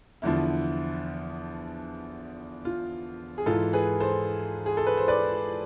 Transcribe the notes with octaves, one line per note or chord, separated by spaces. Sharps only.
E2 D3 F3 E4
F4
G#4
G#2 E3 F4 A4
G#4 B4
A4 C5
G#4
A4
B4
C5
B4 D5